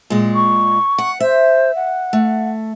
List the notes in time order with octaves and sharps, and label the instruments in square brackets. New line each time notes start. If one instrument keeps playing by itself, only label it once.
[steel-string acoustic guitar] A#2 G#3
[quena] C#6
[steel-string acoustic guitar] F#5
[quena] C5 [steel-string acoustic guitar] E5
[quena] F#5
[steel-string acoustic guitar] A3